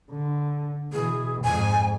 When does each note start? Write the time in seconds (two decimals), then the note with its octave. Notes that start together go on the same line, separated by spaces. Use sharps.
0.11 D3
0.93 B2 E3 G#4
1.44 F2 G#2 G#5